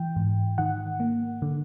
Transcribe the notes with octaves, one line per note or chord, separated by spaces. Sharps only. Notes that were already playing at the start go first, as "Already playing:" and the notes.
Already playing: E3 G5
G#2
D#3 F#5
A#3
D3